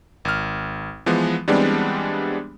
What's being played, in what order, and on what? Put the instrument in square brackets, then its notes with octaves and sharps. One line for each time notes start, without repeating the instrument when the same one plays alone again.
[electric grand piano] G#1 F6
E3 F3 G#3 B3
E3 G3 G#3 B3 C4 D4